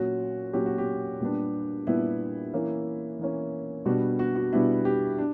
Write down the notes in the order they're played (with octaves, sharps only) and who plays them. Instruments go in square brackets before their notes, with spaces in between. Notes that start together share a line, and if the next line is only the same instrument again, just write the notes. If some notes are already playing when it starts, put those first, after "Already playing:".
Already playing: [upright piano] A#2 F#3 C#4 F#4
A#2 F#3 C#4 G4
F#4
G4
A#2 G3 B3 D4
A#2 G3 B3 D4 E4
E3 A#3 C#4
E3 A#3 C#4
B2 G3 B3 D4 F#4
F#4
F#4
B2 G3 B3 D4 E4
G4
D4